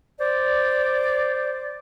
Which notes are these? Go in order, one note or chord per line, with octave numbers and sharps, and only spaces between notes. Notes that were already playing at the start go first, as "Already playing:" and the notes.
C5 D5